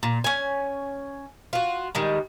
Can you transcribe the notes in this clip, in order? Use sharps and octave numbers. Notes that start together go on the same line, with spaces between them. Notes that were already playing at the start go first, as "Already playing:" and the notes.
A#2
C#4 G#5
F4 F#4
D#3 G3 G#3